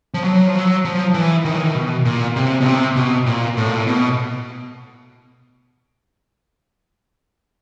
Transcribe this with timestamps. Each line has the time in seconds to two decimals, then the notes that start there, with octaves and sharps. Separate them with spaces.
0.14 F3
0.24 F#3
0.47 F3
0.55 F#3
0.85 F3
1.14 E3
1.45 D#3
1.55 E3
1.65 D#3
1.75 B2
2.05 A#2
2.36 C3
2.61 B2
2.66 C3
2.96 B2
3.26 A#2
3.57 A2
3.66 A#2
3.76 A2
3.87 B2